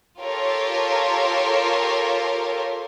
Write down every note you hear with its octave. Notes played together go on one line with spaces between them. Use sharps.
F4 G4 A4 A#4 C#5